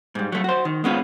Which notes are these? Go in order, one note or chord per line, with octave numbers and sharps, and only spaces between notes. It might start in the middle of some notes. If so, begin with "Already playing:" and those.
G#2 G3
F#3 A3
F#4 C5
D#3
G#3 B3 C#4 F4